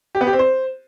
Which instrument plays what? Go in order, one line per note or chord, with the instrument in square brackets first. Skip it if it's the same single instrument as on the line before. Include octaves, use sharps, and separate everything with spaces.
[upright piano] G4
B3
G4
C4
C5